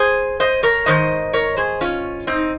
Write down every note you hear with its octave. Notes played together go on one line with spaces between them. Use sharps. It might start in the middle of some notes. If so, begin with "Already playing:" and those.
Already playing: G#4 C5
C5 D#5
A#4 C#5
G#2 D#3 C5 D#5
A#4 C#5
G#4 C5
C#4 F4
C4 D#4